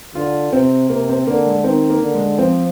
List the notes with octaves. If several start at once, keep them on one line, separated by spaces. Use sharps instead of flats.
D3 F4
C3 C4
C3 A#3
C4
D3 A#3
G#3
D#3 C4
A#3
D3
G#3
F3 C4